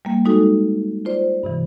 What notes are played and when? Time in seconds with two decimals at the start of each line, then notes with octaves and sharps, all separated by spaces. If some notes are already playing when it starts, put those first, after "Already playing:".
0.05 G3 A#3
0.25 G#3 D#4 F#4 A4
1.05 F4 C5 D5
1.43 G2 C3 E3